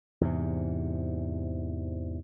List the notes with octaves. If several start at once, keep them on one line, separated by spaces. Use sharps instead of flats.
E2 G#2 C3